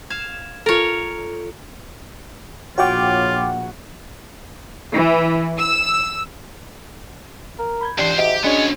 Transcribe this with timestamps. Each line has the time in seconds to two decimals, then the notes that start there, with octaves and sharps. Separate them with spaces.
0.10 F5 G#6 E7
0.66 F4 A4 A#4 C#5
2.78 A#1 F4 F#4 C#5 F#5 G5 D6
4.93 E3
5.57 E6
7.59 A#4
7.81 B5 G6 G#6
7.98 C#2 E3 D4 G4 C5
8.18 G#2 F#4 G4 D#5 E5
8.44 G#3 B3 C#4 D4 F#4 C#5